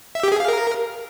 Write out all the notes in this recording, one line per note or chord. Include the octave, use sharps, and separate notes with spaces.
E5
G4
G#4
F5
A#4